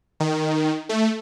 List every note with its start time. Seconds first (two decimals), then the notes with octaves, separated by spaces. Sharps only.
0.20 D#3
0.89 A3